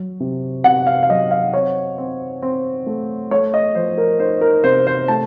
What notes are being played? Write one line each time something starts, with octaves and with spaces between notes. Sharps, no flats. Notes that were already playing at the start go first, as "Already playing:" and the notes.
Already playing: F#3
C3
C3 F#5
F5
F5
F#3 D#5
F5
C4 C#5
C4
C4
A3
A3 C#5
D#5
F3 C5
A#4
D#4 C5
A#4
C3 C5
C5
A3 A5